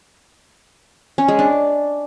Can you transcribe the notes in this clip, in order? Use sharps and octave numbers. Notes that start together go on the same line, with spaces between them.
C#4
G#3
D4